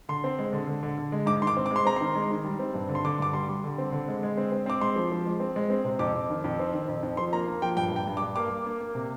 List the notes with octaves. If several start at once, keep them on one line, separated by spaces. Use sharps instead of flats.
D3 C6
C4
G#3
D3
D3
D3
D3
G#3
G#2 D6
D#3 C6
D6
C4
G#3 D6
C6
C4 A#5
D#3 C6
G#3
D#3
G3
C4
G2
D3
C6
D3 D6
G2 D6
G3 C6
G3
D3
C4
D3
G#3
G#3
C4
C4
C4 D6
G#3 C6
F3
F3
G#3
C4
G#3
C4
C3
F2 D6
F2
D#3
F2
C4
D#3
F2
F2
F3 C6
A#3 A#5
A#3
F3 G5
G2 G5
G2 G5
G2
D6
G2
A#3 D6
A#3
A#3
A#3
C3